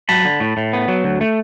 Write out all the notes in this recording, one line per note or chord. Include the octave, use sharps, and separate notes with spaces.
F#3 A5 B5
D3
A2
A2
B3
F#3
D2
A3